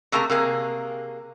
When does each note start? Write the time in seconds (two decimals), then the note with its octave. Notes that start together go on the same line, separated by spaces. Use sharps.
0.12 C3 A3 A#3 G#4 A#5
0.30 C3 A#3 G#4